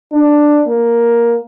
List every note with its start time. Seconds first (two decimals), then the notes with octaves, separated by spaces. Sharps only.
0.13 D4
0.67 A#3